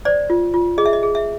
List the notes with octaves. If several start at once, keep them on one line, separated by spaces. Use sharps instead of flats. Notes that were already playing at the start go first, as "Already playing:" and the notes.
C5 D5
F4
F4
G#4 D#5
E5
D#5
G#4
E5